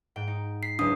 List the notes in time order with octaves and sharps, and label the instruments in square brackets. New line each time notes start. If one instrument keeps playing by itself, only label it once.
[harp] G#2 G5
D#4
[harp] B6 [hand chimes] C7
[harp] F#1 C#2 [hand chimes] D4 D#6